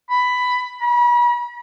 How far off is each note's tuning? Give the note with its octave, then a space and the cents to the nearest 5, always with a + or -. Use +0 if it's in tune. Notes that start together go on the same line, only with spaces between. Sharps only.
B5 +10
B5 -40